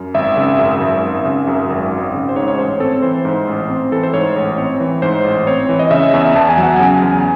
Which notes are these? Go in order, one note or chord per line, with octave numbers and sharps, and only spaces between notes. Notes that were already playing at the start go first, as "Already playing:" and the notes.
Already playing: F#2
G#1 E5
C#3
F#2
G#1
G#1
C#3
F#2
G#1
G#1
C#3
C5
G#2 C#5
C#5
A1 C5
C4 A4
E3 C5
G#2
A1
C4
E3 A4
C5
G#2 C#5
A1
C4 C#5
E3
G#2 C5
A1
C4 C#5
E3
D#5
C#3 E5
E2
E2 A5
G#5
F#3
F#5
C#3 G#5
E2